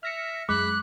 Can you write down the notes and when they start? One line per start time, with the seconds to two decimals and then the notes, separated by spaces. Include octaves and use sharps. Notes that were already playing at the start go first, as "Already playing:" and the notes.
0.03 E5 F6 A#6 C#7
0.49 F#2 G#3 B5 D6 F#6